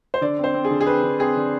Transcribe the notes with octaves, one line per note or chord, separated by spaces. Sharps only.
C5
D3 D5
C4
C5
C4
G#4
D3
G#4
C4 B4
D3
C4 G#4
D3